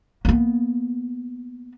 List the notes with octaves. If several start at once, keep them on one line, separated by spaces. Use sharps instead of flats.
A#3 B3